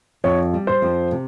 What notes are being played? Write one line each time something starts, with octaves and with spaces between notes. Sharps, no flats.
F2 C#5
G3
C5
F2
C3